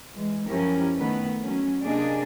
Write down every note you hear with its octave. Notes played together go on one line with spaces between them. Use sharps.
E3 G#3
F#2 F3 C#4 E4 G4 A#4
D#3 A3 B3 B4
F#3 C#4
C3 A#3 D4 G#4 D5 D#5